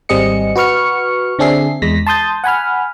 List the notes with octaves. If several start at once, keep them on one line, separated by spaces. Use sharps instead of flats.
G#1 G3 C4 G#4 D#5 C#7
F#4 B4 C#6 F6 C#7
D3 C4 D4 G#4 E5 C7
E2 G#3 A#6 B6
A5 C6 D#6 G6 A6
F#5 G#5 B5 F6